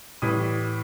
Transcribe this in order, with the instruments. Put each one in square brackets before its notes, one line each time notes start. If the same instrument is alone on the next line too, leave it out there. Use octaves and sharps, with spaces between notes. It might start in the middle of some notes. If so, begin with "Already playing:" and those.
[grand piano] A2 E3 G3 D#6